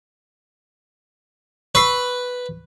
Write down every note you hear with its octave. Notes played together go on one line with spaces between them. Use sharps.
B4 C#6 E6 C7